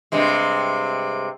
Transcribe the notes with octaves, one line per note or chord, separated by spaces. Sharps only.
G2 C3 G#3